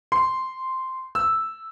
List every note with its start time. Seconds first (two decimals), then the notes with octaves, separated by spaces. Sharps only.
0.12 C6
1.15 E6